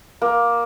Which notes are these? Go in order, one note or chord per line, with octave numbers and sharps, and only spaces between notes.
A#3